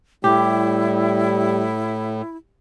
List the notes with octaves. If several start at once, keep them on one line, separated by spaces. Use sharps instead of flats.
A2 G3 E4 G4